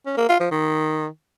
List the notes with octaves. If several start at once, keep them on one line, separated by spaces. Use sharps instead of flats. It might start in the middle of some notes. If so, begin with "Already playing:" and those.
C#4
A#3
F4
F3
D#3